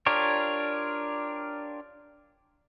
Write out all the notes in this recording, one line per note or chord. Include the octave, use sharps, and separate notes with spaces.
D4 F4 G4 A#4 C#5